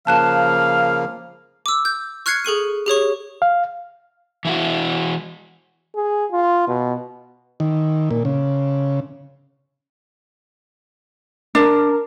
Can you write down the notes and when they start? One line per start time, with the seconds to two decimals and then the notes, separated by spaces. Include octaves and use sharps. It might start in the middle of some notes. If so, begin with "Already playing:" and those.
0.07 C#3 F3 A#3 F5 A5 F#6 E7
1.66 D6 E6
1.85 G6
2.26 C#6 F6 F#6 G#6 C7 C#7
2.45 G#4 A4 C#6 D#7
2.86 G4 G#4 C#5 C#6
3.42 F5
4.45 E3 E4 F#4
5.95 G#4
6.31 F4
6.67 B2
7.60 D#3
8.11 A#2
8.25 C#3
11.55 D4 A#4